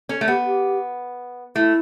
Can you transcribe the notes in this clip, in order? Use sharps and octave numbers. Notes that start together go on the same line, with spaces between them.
C#4 A4
A3
B3 G4
G4
A3 E4